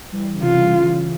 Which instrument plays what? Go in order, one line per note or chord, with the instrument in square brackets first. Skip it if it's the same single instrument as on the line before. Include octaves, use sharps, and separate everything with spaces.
[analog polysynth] E3 G3
C#3
[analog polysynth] C3 E3 [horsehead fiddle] F4
[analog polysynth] C#3
E3
C#3
E3
C#3
E3